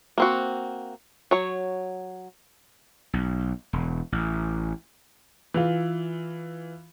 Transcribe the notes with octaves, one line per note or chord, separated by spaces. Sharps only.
A#3 C4 F#4
F#3 C#5
B1
E1
A1
E3 F4